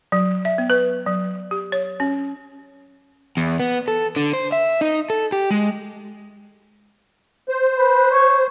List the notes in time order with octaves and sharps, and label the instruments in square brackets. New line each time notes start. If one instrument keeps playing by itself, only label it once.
[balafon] F#3
E5
B3
B4
F#3
G4
C#5
C#4
[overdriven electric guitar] E2
B3
A4
D3
C5
E5
D#4
A4
G4
G#3
[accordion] C5
[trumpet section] B4
C#5